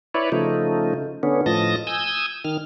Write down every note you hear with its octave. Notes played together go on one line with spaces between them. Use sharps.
E4 B4 C#5 D5
C#3 F3 A3 D#4
D3 B3 C#4
A2 F3 D#5 A5 A#6
G#5 D#6 E6 G6
D#3 F6